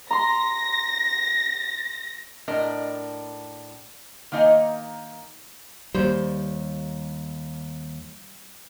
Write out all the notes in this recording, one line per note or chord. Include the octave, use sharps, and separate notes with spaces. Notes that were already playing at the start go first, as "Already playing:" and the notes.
A#5 C6 A#6
A2 D4 A#4 D#5
D#3 A#3 D#4 D#5 G#5
D#2 G3 C5